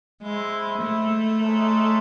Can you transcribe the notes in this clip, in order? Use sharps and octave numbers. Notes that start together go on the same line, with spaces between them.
G#3 E4 C5 E5
A3
G#3 D#4 A4 C#5 E5